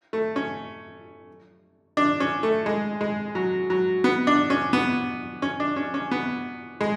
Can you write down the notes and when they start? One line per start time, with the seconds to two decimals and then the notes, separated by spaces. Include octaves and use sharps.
0.13 A3
0.36 C#4
1.97 D4
2.20 C#4
2.43 A3
2.66 G#3
3.01 G#3
3.35 F#3
3.70 F#3
4.04 B3
4.27 D4
4.50 C#4
4.73 B3
5.42 C#4
5.60 D4
5.76 C#4
5.94 C#4
6.11 B3
6.81 G#3